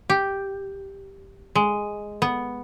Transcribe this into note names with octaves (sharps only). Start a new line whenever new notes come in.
G4
G#3
B3